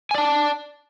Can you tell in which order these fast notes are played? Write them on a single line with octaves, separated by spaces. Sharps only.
G#5 D5 A5